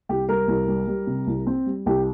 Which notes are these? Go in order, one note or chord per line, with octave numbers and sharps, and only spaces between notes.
C2 G4
G3 A#4
C2
G3
G3
C3
C2
C4
G3
C2 G4